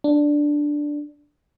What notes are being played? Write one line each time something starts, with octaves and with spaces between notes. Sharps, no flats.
D4